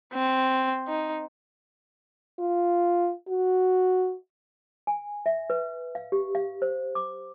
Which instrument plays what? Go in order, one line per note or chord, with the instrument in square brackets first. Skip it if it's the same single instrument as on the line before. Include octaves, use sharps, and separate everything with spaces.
[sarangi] C4
D#4
[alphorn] F4
F#4
[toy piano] G#5
E5
B4
F5
G4
F5
C5
D6